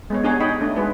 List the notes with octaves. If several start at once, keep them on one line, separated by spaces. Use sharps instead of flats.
G#3 B3 C#5
D4 G4 G#4 C#5 F#5 A#5
D#4 C#5 D#5 G5 B5
A3 D4
G#3 F#4 G#4 B4